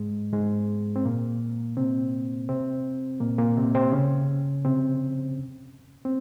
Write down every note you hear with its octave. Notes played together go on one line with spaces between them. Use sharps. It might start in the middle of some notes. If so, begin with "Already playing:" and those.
Already playing: G#2 G#3
G#2 G#3
C4
A#2 A#3
C3 C4
C3 C4
A#2 A#3
A#2 A#3
C3 C4
C3 C4
C#3 C#4
C3 C4
C4